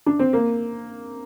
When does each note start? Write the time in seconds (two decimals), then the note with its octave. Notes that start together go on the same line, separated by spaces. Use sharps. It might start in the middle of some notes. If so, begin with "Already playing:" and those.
0.06 D4
0.19 C4
0.33 A#3